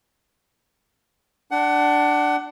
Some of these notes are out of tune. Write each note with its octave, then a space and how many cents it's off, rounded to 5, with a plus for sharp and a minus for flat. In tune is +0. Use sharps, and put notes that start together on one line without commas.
D4 +0 F#5 +25